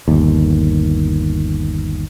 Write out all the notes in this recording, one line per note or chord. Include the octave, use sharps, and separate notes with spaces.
G1 D#2